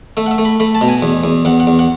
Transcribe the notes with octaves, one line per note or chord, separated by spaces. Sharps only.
A3 E5
F#5
E5
A3
B5
A3 B5
A5
B2
G#5
E2
E2
E2 F#5
F#5
E2
F#5